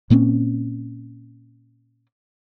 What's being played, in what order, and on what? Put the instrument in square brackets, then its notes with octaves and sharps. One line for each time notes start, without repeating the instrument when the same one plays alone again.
[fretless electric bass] A#2 A#3 C4 C#4